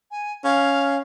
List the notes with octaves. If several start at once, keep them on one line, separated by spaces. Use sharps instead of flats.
G#5
C#4 F5